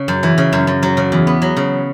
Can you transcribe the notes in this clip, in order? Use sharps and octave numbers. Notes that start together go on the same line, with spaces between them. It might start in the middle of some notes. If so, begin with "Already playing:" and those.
Already playing: C#3
F#2
E3
C#3
F#2
F#2
F#3
C#3
E2
B3
F#3
C#3